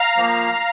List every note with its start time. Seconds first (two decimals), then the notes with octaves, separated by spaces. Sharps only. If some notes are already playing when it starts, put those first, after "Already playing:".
Already playing: F5 A#5
0.17 F3 A#3